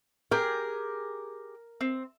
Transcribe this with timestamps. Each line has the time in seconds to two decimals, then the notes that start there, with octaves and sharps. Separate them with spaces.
0.31 G4 G#4 A#4
1.81 C4